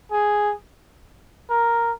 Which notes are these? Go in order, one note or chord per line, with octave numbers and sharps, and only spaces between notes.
G#4
A#4